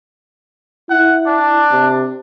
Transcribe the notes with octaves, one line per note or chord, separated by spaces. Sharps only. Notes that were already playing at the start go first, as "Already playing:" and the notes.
E4 F#5
D4
C3